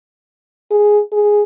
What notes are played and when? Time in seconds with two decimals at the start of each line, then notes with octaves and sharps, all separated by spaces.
0.71 G#4
1.12 G#4